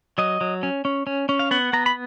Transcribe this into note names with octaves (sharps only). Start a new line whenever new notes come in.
F#3 D#5
F#3
C#4
C#4
C#4
C#4
F5
B3 F#5
B3 A#5
B5